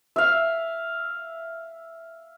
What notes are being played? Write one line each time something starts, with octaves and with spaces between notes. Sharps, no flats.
E5 F5